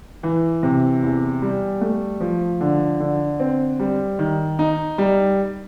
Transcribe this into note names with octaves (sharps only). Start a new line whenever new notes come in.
E3
C3
E2
G3
A3
F3
D3
D3
C4
G3
D#3
D#4
G3